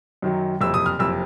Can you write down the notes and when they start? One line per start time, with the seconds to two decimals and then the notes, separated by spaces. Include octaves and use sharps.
0.22 F#2 D#3 F#3
0.61 F#1 F2 C3 E6
0.74 D#6
0.86 F6
0.99 F#1 F2 C3 E6